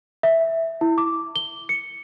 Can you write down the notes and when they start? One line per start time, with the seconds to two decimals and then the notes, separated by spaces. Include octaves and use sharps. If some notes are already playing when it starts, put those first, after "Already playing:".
0.23 E5
0.81 E4
0.98 D6
1.36 G7
1.69 C#7